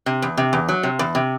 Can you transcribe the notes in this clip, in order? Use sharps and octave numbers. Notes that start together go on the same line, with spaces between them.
C3
E2
C3
E2
F#3
C3
E2
C3